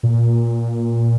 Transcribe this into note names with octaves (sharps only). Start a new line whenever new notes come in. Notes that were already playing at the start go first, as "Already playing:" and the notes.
A#2